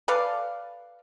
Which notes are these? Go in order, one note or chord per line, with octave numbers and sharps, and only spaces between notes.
A4 B4 D5 F5